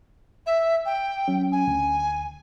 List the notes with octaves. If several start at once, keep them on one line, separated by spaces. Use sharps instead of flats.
E5
G5
F#3 C#4
G#5
D2